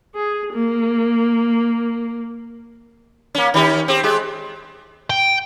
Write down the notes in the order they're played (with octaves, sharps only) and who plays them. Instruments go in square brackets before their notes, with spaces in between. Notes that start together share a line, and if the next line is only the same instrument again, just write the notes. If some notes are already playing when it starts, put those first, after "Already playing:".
[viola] G#4
A#3
[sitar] A#3 C#4
D#3 C#4 G4
C4 G4
G#3 G4
[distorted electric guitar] G5